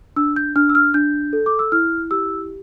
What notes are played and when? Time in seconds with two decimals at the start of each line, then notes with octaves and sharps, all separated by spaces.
0.16 D4 E6
0.36 G6
0.56 D4 F6
0.69 E6
0.75 F6
0.94 D4 G6
1.33 A4
1.46 D6
1.59 E6
1.72 E4 F6
2.11 G4 E6